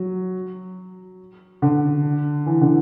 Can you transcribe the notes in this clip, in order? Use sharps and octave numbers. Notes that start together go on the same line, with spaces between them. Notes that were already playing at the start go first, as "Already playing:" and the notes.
Already playing: F#3
D3
E3
D3